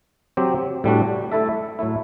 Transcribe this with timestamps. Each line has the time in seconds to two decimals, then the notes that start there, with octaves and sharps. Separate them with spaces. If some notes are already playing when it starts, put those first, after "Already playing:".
0.37 F#3 C4 G4
0.84 A2 G3 D4 F#4
1.32 A3 E4 A4 E5
1.79 A2 F#3 A3 E4